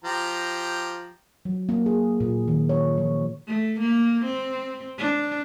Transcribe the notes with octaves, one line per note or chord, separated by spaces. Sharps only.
F3 G4 A#5
F#3
A#3
G#4
A#2
D#3
C#5
F3
A3
A#3
C4
D4